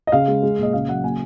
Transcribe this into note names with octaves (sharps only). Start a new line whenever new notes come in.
D#5
C#3 F5
G#3
G#3
A#2 D#5
C#3 F5
F#3 F#5
A#3 G#5